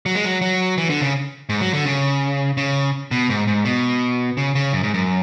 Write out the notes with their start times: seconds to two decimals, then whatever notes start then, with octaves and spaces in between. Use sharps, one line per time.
0.06 F#3
0.15 G#3
0.25 F#3
0.42 F#3
0.78 E3
0.90 D3
1.01 C#3
1.49 G#2
1.61 F#3
1.74 D3
1.85 C#3
2.57 C#3
3.11 B2
3.29 G#2
3.47 G#2
3.65 B2
4.37 C#3
4.55 C#3
4.73 F#2
4.83 G#2
4.94 F#2